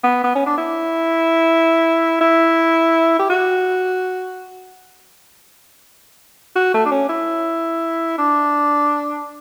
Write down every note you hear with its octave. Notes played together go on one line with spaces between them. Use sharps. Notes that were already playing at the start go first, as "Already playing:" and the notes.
B3
B3
C#4
D4
E4
E4
G4
F#4
F#4
A3
D4
C#4
E4
D4